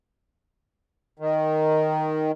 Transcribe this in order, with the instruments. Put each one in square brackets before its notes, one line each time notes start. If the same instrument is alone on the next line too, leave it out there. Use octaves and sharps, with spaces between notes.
[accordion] D#3